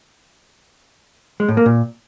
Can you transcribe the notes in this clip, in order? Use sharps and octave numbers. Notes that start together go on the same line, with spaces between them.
G#3
A2
A#3
A#2